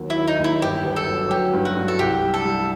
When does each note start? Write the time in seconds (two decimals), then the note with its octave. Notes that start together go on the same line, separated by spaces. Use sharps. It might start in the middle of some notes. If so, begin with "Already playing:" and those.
Already playing: D#2 F#3
0.10 E4
0.16 D#2
0.28 D#4
0.39 D#2
0.44 E4
0.62 G1 G4
0.85 G1
0.96 A4
1.08 F#3
1.30 F#3 G4
1.53 G2
1.65 F#4
1.77 G2
1.88 A4
1.99 C2 G4
2.22 G3
2.34 A4
2.45 G3